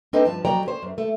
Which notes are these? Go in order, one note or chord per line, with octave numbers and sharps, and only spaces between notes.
C4 D4 D#4 A4 B4 D#5
G2 F3 A5
F2 F#3 D5 F#5 G5 A#5
C#4 C5
F#2
A3